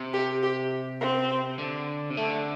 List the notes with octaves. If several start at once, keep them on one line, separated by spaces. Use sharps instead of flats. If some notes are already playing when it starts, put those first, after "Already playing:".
Already playing: C3
G4
G4
C4
D3
C3
D3 A3